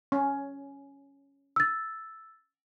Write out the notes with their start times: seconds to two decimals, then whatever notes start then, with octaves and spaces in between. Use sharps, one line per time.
0.12 C#4
1.56 E6 A6